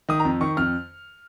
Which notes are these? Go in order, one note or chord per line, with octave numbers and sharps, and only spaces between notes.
D#3 D#6
A#5
F2
D#3 C#6
F2 F6